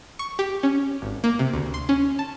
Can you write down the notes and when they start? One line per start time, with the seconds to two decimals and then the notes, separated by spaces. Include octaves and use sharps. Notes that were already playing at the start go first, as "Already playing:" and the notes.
0.19 C#6
0.39 G4
0.63 C#4
1.02 G#1
1.24 A#3
1.39 C3
1.53 D2
1.74 C6
1.89 C#4
2.19 A5